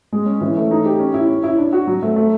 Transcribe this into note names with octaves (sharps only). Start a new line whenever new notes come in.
G#3
C#4
E3
A3
D#4
G4
C#4
E4
C#4
E4
D4
F#4
F#3
A3
A3